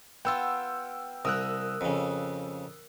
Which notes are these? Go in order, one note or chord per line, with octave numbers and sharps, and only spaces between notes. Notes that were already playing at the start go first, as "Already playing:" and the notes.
B3 F4 G5 E6
C2 A#4 D#6 E6 F#6
F2 C#3